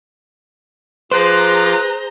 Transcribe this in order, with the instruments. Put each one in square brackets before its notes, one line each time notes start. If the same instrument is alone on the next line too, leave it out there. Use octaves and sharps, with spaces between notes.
[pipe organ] F3 F4 D6 [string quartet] G#4 A#5 G6 [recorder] B4 [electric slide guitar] C5